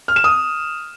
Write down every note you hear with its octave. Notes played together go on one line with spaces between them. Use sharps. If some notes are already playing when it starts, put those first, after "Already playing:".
F6
E7
D#6